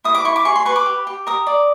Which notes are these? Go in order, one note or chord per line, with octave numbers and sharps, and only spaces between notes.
E4 D#6
D6
E4 C#6
D6
G#4 C#6
C6
B4 C#6
D6
G4
G4
A#4 D#6
D5